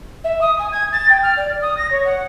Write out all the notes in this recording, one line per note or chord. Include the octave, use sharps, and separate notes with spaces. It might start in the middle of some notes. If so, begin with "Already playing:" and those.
E5
D#6
G#5
G#6
A6
G5
F6
D5
D#6
A#6
C#5
F#5